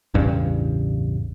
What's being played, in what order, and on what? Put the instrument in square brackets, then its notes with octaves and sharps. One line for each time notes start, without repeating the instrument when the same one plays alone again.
[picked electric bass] A1 E2 G2 C#3